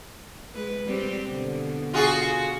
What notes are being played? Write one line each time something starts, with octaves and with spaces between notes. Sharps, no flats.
G#3 B4
G3 C4 G4
B2 D3
F4 F#4 G#4